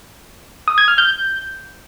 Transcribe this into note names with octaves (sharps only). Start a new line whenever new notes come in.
D#6
G#6
F6
G6